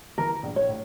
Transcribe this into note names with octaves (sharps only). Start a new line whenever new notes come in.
E3 A#4
A#1
C#5
A2